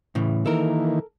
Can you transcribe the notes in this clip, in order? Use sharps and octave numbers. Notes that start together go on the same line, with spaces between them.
A2 C#3 E3
D#3 E3 A#3 A4 A#4